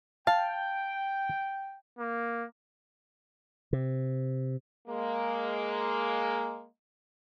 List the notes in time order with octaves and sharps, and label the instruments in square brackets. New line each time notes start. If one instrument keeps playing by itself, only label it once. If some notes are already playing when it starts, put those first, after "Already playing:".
[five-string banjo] F5 [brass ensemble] G5 [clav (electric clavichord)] A5
[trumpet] A#3
[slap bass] C3
[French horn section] G#3 A#3